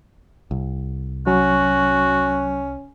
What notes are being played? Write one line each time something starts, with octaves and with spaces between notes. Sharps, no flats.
C2
F#3 C#4 F#4